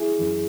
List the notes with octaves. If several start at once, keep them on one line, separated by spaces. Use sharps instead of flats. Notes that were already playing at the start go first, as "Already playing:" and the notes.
Already playing: E4 G#4
F#2 E3